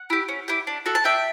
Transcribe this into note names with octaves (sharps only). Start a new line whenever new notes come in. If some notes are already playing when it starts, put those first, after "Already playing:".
Already playing: F#5
E4 G4
C#4
E4 G4
D4
F#4 A4
A5
D4 E5 G5